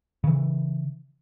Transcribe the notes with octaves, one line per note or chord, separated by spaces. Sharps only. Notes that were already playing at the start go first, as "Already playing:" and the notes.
C#3 E3